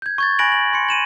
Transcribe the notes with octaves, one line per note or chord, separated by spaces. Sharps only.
G6 G#6
C#6 G#6 A6
G#5 B5 F#6 A#6 D7 F#7
F#7
C6 C#7
D#7 E7 F#7